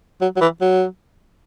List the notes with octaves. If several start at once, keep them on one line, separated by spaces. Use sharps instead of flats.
F#3
F#3
E3
F#3